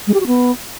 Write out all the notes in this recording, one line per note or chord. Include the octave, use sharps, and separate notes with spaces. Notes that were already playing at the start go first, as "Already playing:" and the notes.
G#3
G4
F#4
B3